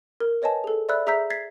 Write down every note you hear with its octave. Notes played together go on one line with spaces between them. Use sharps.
A#4
B4 C#5 D#5 G#5 A5
G#4 A4
C5 D5 E5 B5 E6 F#6
G#4 E5 A#5 E6 G6 B6
G#6 A6 B6 C7